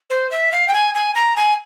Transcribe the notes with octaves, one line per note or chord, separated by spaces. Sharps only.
C5
E5
F5
G5
G#5
G#5
A#5
G#5